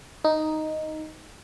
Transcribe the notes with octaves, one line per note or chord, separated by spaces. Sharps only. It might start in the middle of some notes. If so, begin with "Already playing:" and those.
D#4